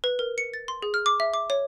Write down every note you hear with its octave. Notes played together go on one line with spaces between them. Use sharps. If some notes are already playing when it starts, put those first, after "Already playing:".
B4
A#4
C#7
A6
C6
G#4
F6
D6
E5
D6
C#5